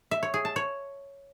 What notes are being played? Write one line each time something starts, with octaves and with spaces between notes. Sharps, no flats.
E5
C#5
G#4
A5
C#5